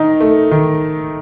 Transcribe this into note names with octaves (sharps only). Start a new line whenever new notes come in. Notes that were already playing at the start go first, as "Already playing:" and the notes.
Already playing: D#3 D#4
A3
D#3